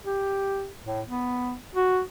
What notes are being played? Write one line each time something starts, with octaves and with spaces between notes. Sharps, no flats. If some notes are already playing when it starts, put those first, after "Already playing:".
G4
A2
B3
F#4